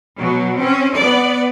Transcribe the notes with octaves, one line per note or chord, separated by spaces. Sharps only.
B2 F#3
C4 C#4
B3 D5